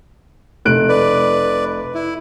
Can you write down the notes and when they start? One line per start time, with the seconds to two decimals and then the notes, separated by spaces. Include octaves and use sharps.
0.65 F1 F#6 D7
0.89 B4 D5
1.94 E4